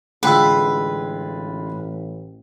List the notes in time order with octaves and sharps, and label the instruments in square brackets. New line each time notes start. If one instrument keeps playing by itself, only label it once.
[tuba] A1 [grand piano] D3 G#3 F4 [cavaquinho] B4 [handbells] F#5 G5 E6